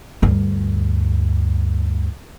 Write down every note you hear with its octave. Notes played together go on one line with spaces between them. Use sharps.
D2 G2